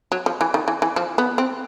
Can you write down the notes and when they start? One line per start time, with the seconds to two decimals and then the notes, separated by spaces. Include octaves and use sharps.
0.12 F#3
0.26 F3
0.41 E3
0.54 D#3
0.68 E3
0.82 E3
0.96 F3
1.18 B3
1.38 C4